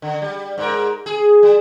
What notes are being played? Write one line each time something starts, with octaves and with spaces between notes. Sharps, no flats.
D3
G3
G#2 A#4
G#4
G3